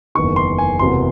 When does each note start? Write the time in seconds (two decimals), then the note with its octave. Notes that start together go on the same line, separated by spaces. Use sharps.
0.15 F#1 E2 D#3 C#6
0.36 C6
0.58 G#5
0.79 F#1 E2 C3 F#3 C6